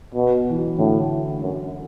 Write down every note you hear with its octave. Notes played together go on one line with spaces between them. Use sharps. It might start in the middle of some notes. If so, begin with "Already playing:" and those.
B2
E3
F#3
A2 D3
F#2